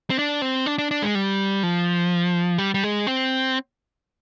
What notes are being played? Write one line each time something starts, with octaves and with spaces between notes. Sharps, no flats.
C4
D4
C4
D4
D4
D4
G#3
G3
F3
G3
G3
G#3
C4